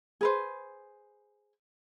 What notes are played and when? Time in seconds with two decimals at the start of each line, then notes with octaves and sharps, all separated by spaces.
0.21 G#4 B4 C5